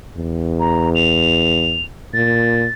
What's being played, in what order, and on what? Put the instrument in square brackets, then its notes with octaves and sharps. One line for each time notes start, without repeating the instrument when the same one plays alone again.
[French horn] E2
[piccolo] A#5
F7
[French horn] A#2 [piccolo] A6